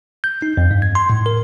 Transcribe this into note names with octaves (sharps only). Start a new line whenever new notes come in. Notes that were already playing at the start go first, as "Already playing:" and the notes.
G6
D#4
F2
G2
G#6
C6
A2
A#4